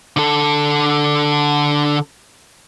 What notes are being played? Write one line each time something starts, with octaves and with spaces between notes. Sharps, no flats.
D3 A4